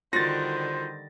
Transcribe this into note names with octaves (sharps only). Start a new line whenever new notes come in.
D3 D#3 G3 F4 F#4 C5 A6 A#6